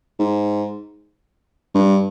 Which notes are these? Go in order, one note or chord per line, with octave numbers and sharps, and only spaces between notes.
G#2
G2